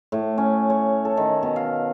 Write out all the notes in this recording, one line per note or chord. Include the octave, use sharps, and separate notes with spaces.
A2
C#4
C#5
A4
D#3
B2
F5